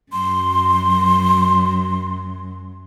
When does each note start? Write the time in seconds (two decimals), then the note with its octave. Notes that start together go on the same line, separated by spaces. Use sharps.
0.12 F#2 F#3 C6